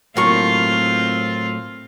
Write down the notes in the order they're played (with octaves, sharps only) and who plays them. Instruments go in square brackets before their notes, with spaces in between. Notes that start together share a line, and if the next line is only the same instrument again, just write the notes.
[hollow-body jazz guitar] A2 F#3 A#3 [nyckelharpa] C4 F4 [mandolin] A#4 C#6